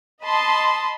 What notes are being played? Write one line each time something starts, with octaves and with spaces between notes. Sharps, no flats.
D#5 A5 B5 C6 D#6